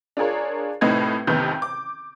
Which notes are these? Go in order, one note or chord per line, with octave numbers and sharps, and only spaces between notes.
D4 F4 G#4 A#4 C#5
C2 A2 C4 D#4 B4 G#6
A1 F2 C3 D#3 B3 G6
D6